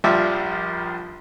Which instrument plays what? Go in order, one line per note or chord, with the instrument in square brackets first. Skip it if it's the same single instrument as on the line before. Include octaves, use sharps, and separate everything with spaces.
[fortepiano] A#1 F3 G3 E5 D6